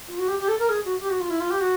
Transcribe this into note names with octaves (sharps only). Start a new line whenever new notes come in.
F4
F#4
G4
G4
A4
A#4
G#4
F#4
G4
F#4
F4
E4
F4
G4
F#4